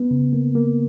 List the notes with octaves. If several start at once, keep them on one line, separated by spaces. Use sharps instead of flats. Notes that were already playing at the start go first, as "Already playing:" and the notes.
Already playing: B3
C#3
A#3
A#3